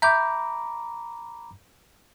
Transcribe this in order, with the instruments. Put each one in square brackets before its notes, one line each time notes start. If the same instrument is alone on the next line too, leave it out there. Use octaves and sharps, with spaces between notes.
[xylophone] E5 G6 [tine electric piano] A#5 B5 D6